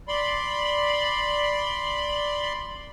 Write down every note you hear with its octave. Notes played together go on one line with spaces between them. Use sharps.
D5 B5 C6